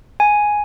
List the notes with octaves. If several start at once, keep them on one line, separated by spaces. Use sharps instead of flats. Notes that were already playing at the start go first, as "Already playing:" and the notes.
G#5